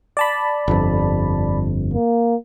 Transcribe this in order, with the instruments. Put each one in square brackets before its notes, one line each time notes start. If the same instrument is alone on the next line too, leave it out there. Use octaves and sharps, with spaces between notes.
[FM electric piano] D5 A5 B5
[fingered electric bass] G1 F2
[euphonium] A#3